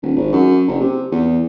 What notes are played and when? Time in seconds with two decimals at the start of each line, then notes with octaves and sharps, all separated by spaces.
0.03 D#1
0.16 G#1
0.33 F#2
0.67 F#1
0.80 C3
1.11 E2